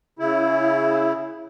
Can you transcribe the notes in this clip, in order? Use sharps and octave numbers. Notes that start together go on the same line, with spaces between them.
C#3 E4